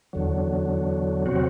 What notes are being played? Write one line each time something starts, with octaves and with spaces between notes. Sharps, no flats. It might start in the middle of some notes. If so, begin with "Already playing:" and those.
E2 D3 F#3
C3 F#3 C4 F#4